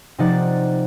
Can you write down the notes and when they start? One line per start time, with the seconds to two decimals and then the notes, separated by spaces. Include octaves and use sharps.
0.18 C3 F3 D#4 D5 F#5 A6